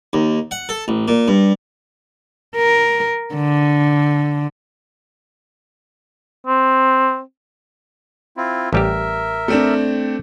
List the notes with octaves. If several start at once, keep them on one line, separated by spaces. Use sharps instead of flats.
D#2
F#5
A4
A1
A#2
G2
A#4
D3
C4
C4 E4 F4
A1 G3 G4 A#4 E5
A3 C4 D4